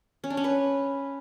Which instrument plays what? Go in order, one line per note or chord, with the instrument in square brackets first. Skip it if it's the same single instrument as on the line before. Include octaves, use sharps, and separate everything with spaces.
[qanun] C#4
D4
C#4
B4